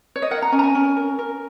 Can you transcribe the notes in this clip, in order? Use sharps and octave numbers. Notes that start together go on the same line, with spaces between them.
C#5
D#5
A#4 F#5
A#5
C#4 G#5
A#5
G#5
C#4
A#4
A#4